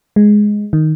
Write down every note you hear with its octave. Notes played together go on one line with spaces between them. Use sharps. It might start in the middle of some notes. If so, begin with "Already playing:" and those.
G#3
D#3